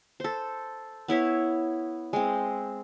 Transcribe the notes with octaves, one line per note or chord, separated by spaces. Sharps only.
A4 C5
B3 E4 C#5 E5
G#3 C4